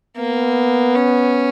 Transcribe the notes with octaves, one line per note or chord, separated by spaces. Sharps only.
A#3 B3
C#4